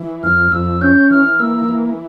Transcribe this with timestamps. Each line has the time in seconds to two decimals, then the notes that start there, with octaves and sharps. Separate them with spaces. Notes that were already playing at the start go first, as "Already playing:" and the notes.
Already playing: E3
0.23 F2 F6
0.52 F2 E6
0.81 C#4 G6
1.11 E3 F6
1.40 A#3 E6
1.69 E3